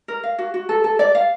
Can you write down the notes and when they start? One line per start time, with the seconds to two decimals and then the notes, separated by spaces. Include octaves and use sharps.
0.08 A#4
0.24 F5
0.39 F#4
0.54 F#4
0.69 A4
0.84 A4
0.99 D5
1.15 F5